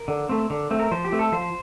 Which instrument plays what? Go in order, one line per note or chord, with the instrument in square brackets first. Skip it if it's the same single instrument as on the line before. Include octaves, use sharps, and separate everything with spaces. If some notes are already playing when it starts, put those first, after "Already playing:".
Already playing: [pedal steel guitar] A#4
D3
A3 C4
D3
A3 C4
A#4
F3 C5
G4
A3 C4
A4
F3 C5